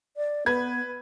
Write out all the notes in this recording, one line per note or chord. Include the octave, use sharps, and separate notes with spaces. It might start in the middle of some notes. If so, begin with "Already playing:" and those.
D5
B3 B4 G#6